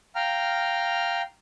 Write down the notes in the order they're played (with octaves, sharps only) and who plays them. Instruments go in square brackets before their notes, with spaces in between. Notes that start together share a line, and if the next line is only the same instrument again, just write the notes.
[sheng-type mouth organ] F5 G5 A#5 F6